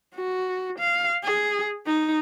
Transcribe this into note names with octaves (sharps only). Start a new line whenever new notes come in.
F#4
F5
G#4
D#4